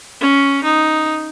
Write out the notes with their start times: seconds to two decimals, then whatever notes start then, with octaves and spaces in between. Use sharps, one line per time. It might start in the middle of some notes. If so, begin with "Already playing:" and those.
0.21 C#4
0.64 D#4